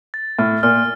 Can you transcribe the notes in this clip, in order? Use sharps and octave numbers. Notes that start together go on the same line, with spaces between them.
A6
A2 F6
A#2 F6